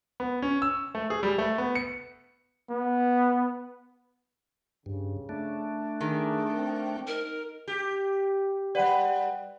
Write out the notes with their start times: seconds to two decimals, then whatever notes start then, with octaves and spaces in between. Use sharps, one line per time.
0.20 B3
0.42 C#4
0.62 E6
0.95 A3
1.10 G#4
1.23 G3
1.38 A3
1.58 B3
1.75 C#7
2.70 B3
4.86 G2 C#3
5.29 A3 D4
6.01 D#3 G#4
6.57 C4
7.07 D#4 A#4
7.68 G4
8.75 G3 B4 D5 F#5 G5